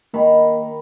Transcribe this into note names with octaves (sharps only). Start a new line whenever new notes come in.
D#3 A#3 B5